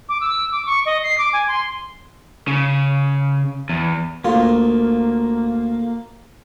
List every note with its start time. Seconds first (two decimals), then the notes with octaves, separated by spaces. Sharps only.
0.09 D6
0.21 E6
0.52 D6
0.66 C#6
0.86 D#5
1.03 C7
1.18 D6
1.33 G#5
1.48 C6
2.48 C#3
3.69 E2
4.24 D2 A#3 F4